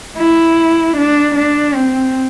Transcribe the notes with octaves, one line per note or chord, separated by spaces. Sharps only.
E4
D4
D4
C4